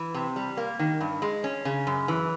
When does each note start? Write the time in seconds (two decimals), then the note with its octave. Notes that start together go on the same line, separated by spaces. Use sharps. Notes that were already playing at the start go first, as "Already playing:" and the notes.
Already playing: E3
0.14 C3
0.36 G3
0.57 A#3
0.79 D#3
1.00 G2
1.22 G#3
1.44 C#4
1.65 C#3
1.87 F#2
2.08 E3